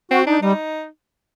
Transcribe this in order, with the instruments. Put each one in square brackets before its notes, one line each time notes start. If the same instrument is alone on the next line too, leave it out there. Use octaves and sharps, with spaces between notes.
[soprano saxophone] C4 [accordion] F#4
[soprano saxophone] D4 [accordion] D#4
[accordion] G3 [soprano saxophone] D#4